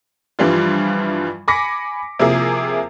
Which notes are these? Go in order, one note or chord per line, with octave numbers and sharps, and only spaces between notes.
G2 E3 F3 G3 F4
G#5 B5 D6 A#6 B6 C#7
C3 F3 A#3 E4 G#4 A#4